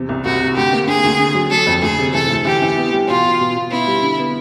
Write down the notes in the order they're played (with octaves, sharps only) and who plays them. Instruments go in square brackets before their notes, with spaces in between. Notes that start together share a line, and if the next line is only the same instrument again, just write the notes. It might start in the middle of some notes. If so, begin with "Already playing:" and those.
Already playing: [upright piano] E2 C3
C2
[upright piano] C2 [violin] F#4
[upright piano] C3
[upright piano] D2 [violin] G4
[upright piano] A#3
[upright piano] D3 [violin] G#4
[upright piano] D2
D3
F#3
[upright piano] F#3 [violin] A4
[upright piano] F2
[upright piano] D2 [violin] G#4
[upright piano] C3
[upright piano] E3 [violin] A4
[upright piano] D2
[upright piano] E3 [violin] G4
[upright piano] E3
B3
G3
[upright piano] B2 [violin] F4
[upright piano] B2
B2
B2
[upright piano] B3 [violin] E4
[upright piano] G3
D3
B3